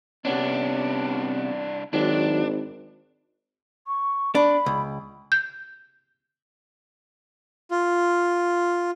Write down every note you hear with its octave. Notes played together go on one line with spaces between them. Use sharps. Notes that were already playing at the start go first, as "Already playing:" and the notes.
C2 C3 B3 C#4 D4
G#1 D#3 F#3 D4
C#6
D4 B5
C#2
G6
F4